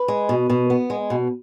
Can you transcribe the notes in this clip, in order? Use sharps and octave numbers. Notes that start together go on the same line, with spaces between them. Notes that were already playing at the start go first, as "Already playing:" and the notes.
Already playing: B4
G#3
B2
B2
B3
G#3
B2